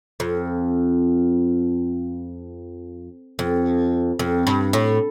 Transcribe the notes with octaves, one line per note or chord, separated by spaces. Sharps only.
F2
F2
F2
G2
A2